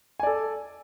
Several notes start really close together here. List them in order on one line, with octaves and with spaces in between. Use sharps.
G#5 D5 A4